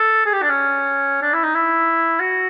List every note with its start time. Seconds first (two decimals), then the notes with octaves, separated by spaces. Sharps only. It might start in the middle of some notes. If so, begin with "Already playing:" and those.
Already playing: A4
0.26 G#4
0.33 G4
0.42 D4
0.50 C#4
1.22 D4
1.33 E4
1.44 D#4
1.54 E4
2.20 F#4